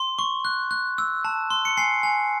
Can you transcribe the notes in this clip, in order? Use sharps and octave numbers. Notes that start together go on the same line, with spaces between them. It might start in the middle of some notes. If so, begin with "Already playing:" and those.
Already playing: C6
C#6
F#6
F#6
E6
A5
C6
C#7
G#5 C7
G#5